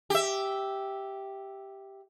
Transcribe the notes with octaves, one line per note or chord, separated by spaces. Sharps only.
G4 E5